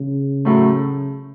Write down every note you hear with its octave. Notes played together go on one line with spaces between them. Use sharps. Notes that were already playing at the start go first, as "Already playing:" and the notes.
Already playing: C#3
A2 F#3 A3